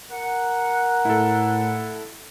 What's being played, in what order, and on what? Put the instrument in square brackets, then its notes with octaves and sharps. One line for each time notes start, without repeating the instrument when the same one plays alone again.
[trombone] A#4 [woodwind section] F#5
[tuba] A2 [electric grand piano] E4 A4